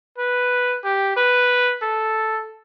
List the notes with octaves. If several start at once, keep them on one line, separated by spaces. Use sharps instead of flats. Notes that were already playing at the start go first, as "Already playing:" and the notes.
B4
G4
B4
A4